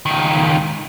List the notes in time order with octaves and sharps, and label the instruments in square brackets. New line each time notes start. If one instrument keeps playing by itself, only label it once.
[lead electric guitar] C#2 D#3